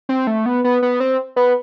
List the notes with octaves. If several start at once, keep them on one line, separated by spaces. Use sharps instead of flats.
C4
A3
B3
B3
B3
C4
B3